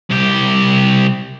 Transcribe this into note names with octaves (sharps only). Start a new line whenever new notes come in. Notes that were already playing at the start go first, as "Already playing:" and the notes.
C2 G4